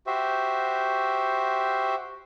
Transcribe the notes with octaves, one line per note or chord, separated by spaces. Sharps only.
F#4 G4 C5 E5